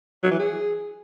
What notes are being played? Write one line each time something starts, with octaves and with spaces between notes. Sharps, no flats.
F#3
E3
G#4